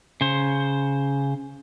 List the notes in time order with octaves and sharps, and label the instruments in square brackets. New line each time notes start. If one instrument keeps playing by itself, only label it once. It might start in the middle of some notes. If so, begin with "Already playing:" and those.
[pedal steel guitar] C#3 C5